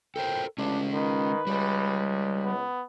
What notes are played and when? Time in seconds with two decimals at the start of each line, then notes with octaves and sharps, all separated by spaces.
0.16 A4 A#4 C5 G5
0.58 A1 G#3 C#4 D4
0.93 D#3 B4
1.47 C#2 G3
2.43 B3